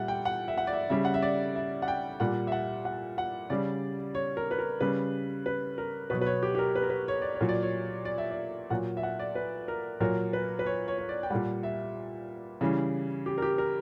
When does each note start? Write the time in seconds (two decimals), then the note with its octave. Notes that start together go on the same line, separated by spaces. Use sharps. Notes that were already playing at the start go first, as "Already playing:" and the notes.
Already playing: A#2 G3 E5 F#5
0.08 G5
0.25 F#5
0.48 E5
0.58 F#5
0.67 D5
0.73 E5
0.90 C#3 G3 E5
1.05 F#5
1.14 E5
1.22 D5
1.55 E5
1.82 F#5
1.88 G5
2.20 A#2 G3 F#5
2.47 E5
2.52 F#5
2.85 F#5
3.18 F#5
3.50 C#3 G3 D5
4.15 C#5
4.37 A#4
4.51 B4
4.59 A#4
4.80 C#3 G3 B4
5.46 B4
5.78 A#4
6.10 B2 F#3 B4
6.21 B4
6.26 C#5
6.43 G4
6.55 G4
6.59 A#4
6.75 B4
6.83 A#4
6.90 B4
7.08 C#5
7.22 D5
7.35 C#5
7.41 A#2 F#3
7.49 D5
7.62 C#5
8.05 D5
8.18 E5
8.31 D5
8.70 A#2 F#3 F#5
8.97 E5
9.03 F#5
9.20 D5
9.35 B4
9.68 A#4
10.00 A#2 F#3 A#4
10.33 B4
10.59 B4
10.66 C#5
10.88 C#5
10.98 C#5
11.09 D5
11.23 G5
11.30 A#2 G3 F#5
11.63 E5
12.61 C#3 E3 G3
13.26 G4
13.38 A#4
13.42 G4
13.58 A#4